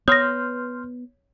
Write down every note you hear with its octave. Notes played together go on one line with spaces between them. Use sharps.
B3 C#5 C6 D#6 F6 G6 A#6